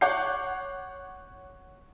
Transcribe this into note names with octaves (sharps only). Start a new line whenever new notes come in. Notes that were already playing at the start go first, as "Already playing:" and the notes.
C#5 F#5 D6 G6 C7